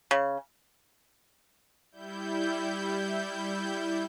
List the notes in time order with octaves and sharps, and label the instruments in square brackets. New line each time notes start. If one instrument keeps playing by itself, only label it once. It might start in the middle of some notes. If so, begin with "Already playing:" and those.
[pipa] C#3
[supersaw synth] G3 E4 G6